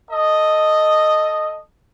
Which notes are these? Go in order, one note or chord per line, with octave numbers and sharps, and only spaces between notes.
A4 D#5